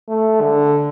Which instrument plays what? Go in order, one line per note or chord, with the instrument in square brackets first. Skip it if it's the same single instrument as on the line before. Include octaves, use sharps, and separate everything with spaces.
[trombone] A3
D3